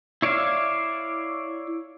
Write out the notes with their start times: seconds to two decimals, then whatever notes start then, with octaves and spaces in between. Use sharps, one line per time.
0.22 E4 C#5 D5 E5 F5